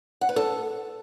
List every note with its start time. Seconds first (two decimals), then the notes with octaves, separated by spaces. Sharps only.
0.21 F#5
0.29 B4
0.36 A4